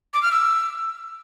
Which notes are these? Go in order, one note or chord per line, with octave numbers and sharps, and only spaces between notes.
D6
F6
E6